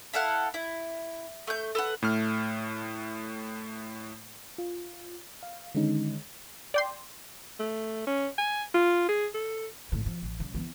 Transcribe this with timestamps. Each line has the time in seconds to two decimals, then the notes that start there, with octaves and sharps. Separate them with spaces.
0.13 E4 A4 F5 F#5
0.54 E4
1.47 A3 G6
1.75 A4 B4 F#5
2.02 A2 A3 F6
4.58 F4
5.43 F5
5.75 D3 D#3 G#3 C#4 D#4
6.74 D5 G5 C6
7.59 A3
8.07 C#4
8.38 G#5
8.74 F4
9.08 G#4
9.34 A4
9.92 G#1 A2
10.06 F3
10.22 A1
10.40 C#3 G3
10.55 E3 B3